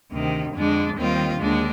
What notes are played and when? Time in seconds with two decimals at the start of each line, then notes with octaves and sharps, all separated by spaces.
0.11 D2 C3 D#3
0.54 F2 D3 G#3 D4
0.96 D#2 D#3 G3 C4 F4
1.39 D#2 D3 G#3 D4